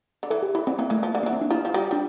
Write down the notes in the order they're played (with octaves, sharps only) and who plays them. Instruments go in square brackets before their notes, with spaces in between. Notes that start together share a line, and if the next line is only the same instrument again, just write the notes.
[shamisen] D3
[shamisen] E3 [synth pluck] A4
[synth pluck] G4
[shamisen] E3 [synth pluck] E4
[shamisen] D3 [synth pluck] C4
[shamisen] E3 [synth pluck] A#3
[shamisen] E3 [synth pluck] A3
[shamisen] F3 [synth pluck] A#3
[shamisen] D3
[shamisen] E3 [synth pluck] A#3
[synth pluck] C4
D4
[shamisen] F3 [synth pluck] E4
[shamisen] F3
[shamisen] G3 [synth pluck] F4
[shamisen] G3 [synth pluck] D4